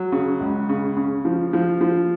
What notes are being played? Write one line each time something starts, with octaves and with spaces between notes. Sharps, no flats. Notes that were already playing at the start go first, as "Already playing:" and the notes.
Already playing: F#3
C#3
C#2
C#3
C#3
F3
F3
F3